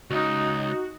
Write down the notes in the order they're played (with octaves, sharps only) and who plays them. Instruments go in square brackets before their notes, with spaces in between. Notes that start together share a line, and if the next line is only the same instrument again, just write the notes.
[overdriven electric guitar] C#2 [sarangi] D#4 [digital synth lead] F#4